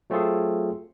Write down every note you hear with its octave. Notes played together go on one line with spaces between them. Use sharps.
F#3 A3 C4 F4 G#4 A4